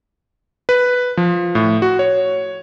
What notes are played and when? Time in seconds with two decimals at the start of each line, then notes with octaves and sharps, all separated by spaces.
0.69 B4
1.17 F3
1.55 A2
1.82 F#4
1.99 C#5